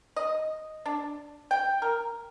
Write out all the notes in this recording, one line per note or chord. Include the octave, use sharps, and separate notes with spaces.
D#5
D4
G5
A#4